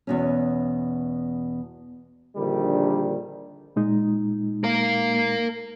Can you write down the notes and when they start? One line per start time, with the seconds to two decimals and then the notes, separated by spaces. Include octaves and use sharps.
0.07 E2 B2 C#4
2.36 A#1 D3 D#3 G3
3.76 A#2 G#3 D#4
4.64 A#4 F5